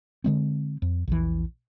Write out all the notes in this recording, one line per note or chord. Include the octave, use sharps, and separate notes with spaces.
D3 G#3 C4
F2
A#1 E2 E3